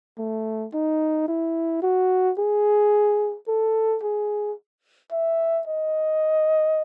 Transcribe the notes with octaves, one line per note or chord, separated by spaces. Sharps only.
A3
D#4
E4
F#4
G#4
A4
G#4
E5
D#5